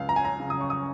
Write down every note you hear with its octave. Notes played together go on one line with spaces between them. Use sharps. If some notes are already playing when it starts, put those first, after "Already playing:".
Already playing: C#2 F5
A#5
G#5
A#5
C#3
D#6
C#6
D#6